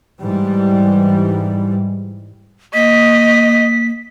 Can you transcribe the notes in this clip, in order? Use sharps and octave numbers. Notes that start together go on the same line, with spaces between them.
G#2 E3 G3
A#3 D#5 B6